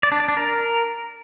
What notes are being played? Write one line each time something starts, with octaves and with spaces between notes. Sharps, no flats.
D5
D4
D5
D4
A#4